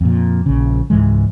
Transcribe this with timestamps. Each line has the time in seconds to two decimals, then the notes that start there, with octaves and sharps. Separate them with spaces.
0.01 F2 A#2
0.46 A#1 C#3
0.90 C#2 G#2 E3 G#3